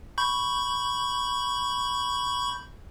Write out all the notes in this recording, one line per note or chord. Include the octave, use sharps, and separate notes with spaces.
B5 C#6 G6